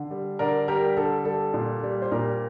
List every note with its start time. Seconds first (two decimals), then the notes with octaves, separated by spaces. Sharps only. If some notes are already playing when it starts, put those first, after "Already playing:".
Already playing: D3
0.11 G3
0.39 D3 A#4 D5
0.68 G3 G4 A#4
0.97 D3 A4
1.25 G3 A4
1.54 A#2
1.83 G3
2.02 C5
2.11 A#2 G4 A#4